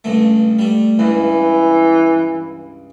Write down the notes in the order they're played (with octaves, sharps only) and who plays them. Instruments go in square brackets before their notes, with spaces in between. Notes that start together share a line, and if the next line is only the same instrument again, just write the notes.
[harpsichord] C#2 G2 A3
G3 A3
[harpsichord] C#2 G2 [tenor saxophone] E3